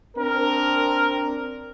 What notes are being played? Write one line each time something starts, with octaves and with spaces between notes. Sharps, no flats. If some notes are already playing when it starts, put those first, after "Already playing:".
C4 D4 A#4